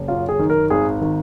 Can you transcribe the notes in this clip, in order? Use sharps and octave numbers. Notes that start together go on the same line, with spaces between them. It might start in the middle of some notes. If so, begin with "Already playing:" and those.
Already playing: F#1
F#2 F4
G#4
D#3
A#4
G#1 G#4
D#3